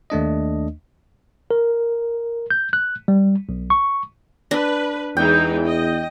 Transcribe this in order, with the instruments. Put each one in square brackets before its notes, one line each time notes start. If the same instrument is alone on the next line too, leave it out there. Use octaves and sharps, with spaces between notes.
[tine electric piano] D#2 A3 D4 D#5
A#4
G6
F#6
G3
B1
C#6
[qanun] D4 [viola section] B4
[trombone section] E2 [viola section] E3 G#3 D#4 [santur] G5
[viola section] D#5